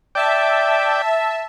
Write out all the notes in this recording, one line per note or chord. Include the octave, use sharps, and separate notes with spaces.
D5 E5 G5 A5